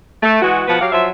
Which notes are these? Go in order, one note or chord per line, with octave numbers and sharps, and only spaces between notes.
A3
E3 G#3 F#4
B2 F3 B3 B4 F#5
F#3 G4 F5
F3 F#3 C5 E5